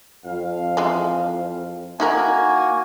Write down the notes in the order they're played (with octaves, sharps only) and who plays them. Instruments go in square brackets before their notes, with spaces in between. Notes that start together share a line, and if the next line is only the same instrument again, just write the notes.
[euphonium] F2 [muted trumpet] F5
[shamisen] E3 G#3
[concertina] A#3 F#4 [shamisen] D#4 E4 A#4 [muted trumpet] G#5